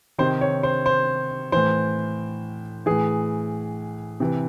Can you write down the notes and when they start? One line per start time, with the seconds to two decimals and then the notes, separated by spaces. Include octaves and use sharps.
0.18 C3 D#3 C5
0.41 C#5
0.63 C5
0.86 C5
1.52 A2 E3 C5
2.86 A2 E3 G#4
4.20 C3 E3